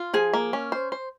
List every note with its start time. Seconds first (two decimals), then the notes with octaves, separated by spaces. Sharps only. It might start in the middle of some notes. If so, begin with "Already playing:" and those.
Already playing: F4
0.14 F3 G#4
0.34 A#3
0.53 C#4
0.72 C5
0.92 C5